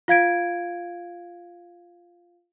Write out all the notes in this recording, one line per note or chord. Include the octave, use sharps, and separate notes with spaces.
F4 F5 G#6 D7